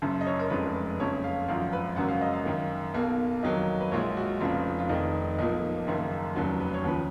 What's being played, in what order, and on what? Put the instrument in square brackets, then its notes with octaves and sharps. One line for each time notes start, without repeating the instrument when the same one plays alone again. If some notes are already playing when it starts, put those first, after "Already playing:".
[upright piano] F#1 F#2 C#3
D#5
C#5
A#4
F1 F2 C#3 G#3 B4
F#1 F2 C#3 C#5
F5
G#1 F#2 F3 F5
B4
G#1 F#2 C#3 F#3 A#3 F#5
F5
D#5
F5
F#2 D#3 A#3
B1 B2 A#3
F2 D#3 F#3 A#3 D#5
B4
A#1 A#2 G#3 C#5
F#4
F1 F2 C#3 F3 F4
F4
F1 F2 D#3 D#4
B1 A#2 F3 A#3 D#4
F#1 F#2 D#3 A#3
F1 D#2 C#3 F#3 F#4
B4
C#5
D#2 C#3 F3 B4